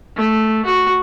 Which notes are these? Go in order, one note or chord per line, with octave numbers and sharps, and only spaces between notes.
A3
F#4